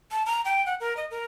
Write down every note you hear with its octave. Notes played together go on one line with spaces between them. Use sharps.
A5
A#5
G5
F#5
A#4
D#5
A#4